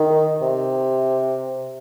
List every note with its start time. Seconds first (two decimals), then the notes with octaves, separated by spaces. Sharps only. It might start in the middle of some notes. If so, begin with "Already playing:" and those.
Already playing: D#3
0.42 C3